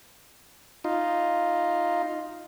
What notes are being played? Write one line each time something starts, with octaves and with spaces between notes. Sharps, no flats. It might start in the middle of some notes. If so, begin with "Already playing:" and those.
D#4 F4